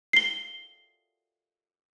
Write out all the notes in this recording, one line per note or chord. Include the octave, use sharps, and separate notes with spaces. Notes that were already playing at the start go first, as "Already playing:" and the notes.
C7 G7